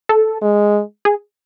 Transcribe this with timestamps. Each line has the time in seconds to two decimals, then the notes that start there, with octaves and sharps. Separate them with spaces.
0.09 A4
0.42 G#3
1.05 G#4